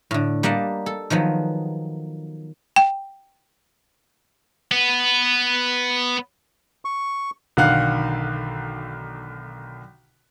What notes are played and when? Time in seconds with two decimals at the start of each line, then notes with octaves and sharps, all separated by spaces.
0.11 A2 D3
0.43 G3 A#3 D#5 F#5 A5
0.86 A4
1.10 D#3 F3 F#3 B3
2.76 G5
4.71 B3 B4
6.85 C#6
7.57 B1 D3 D#3 F5 F#5 F#6